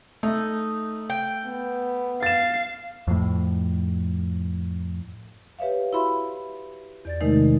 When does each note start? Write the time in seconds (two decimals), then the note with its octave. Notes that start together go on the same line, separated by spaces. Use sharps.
0.23 A3 D#4
1.10 G5
1.46 B3
2.23 F5 A6 E7
3.08 F2 A2
5.59 G4 B4 C#5 E5 F5
5.93 E4 F#4 E5 B5 C6
7.05 E2 D5 A6
7.21 C3 D#3 G#3 A3 D#4 A#4